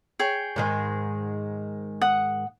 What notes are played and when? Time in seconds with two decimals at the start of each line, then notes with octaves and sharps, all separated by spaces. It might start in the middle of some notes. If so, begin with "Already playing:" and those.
0.19 G#4 C#5 G5
0.56 G#2 D#3 G#3
2.01 F#5 D#6